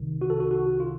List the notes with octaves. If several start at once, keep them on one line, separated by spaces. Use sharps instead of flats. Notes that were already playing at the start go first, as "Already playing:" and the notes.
Already playing: C2 C3 D#3
F#4
A4
F#4
F#4
F4